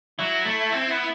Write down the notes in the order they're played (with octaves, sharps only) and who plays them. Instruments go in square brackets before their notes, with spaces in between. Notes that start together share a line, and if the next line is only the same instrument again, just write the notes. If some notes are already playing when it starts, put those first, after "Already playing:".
[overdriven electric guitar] F#3 [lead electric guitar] E4
[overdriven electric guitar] A3
C4
B3